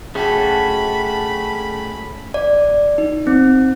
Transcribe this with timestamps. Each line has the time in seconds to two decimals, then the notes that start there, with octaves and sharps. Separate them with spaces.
0.15 A3 C#4 F#4 G#4 G5 A5 B5
2.34 D5
2.98 D#4
3.27 C4